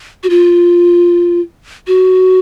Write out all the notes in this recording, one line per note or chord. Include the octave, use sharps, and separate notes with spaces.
F#4
F4
F#4